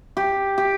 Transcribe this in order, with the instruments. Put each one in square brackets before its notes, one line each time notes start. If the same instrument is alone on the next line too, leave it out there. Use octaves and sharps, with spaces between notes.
[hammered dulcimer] G4
G4